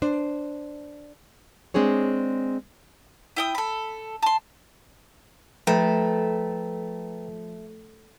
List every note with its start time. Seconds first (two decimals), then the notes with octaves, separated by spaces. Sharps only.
0.02 D4 C5
1.74 G#3 C4 D4 G#4 C#5
3.36 E4 G5 D#6
3.55 A4 B5
4.22 A5 C6
5.67 F3 A3 B4 G5 A#5